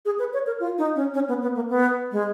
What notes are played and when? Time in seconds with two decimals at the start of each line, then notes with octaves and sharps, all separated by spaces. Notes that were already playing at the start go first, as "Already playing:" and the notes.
0.05 G#4
0.19 B4
0.33 C#5
0.47 A#4
0.60 F4
0.78 D#4
0.96 C#4
1.14 C#4
1.28 B3
1.42 B3
1.55 A#3
1.69 B3
2.12 G#3